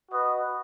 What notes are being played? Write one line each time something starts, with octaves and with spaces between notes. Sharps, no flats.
F#4 B4 D#5